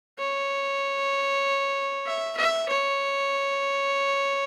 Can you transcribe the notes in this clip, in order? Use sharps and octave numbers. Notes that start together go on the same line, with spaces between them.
C#5
E5
E5
C#5